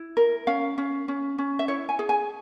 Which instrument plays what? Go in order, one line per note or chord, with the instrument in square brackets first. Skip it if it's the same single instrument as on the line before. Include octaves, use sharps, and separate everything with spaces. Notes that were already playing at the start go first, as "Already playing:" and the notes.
Already playing: [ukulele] E4
A#4
C#4 F5
C#4
C#4
C#4
E5
E4 C#5
G#5
G#4
G#5